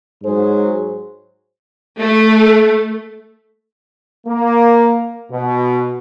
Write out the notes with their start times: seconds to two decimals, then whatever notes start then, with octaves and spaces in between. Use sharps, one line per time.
0.24 G#2 F#3 G#4 C5
1.99 A3
4.27 A#3
5.32 B2